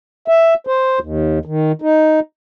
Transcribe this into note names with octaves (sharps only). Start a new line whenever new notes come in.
E5
C5
D#2
D#3
D#4